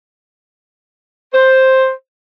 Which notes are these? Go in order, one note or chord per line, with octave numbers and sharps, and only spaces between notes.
C5